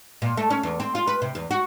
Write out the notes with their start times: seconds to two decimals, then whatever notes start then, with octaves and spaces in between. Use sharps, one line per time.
0.22 A#2
0.37 A3
0.50 C#4
0.63 E2
0.80 C4
0.95 F4
1.07 B4
1.22 C3
1.35 E2
1.51 F#4